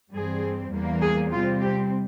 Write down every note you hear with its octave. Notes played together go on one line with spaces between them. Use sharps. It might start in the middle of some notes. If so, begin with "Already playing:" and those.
G2 E3 G3 C4 G#4
E2 E3 G3 A#3
G#4
C3 G3 C4 F4
G4